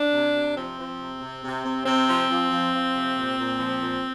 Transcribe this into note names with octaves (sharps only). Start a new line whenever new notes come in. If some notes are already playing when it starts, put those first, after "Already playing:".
Already playing: D4
C3
C3
F3 C4
F3
C3
C3
C3
C3
C3 C4
F3
F3
F3
F3
C3
A#2
A#2
F3
A#2